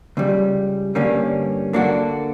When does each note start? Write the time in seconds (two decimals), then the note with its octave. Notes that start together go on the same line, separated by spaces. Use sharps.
0.17 C#2 C#3 G3
0.95 G2 D3 G3 A#3 C#4
1.73 D3 A#3 D4 F#4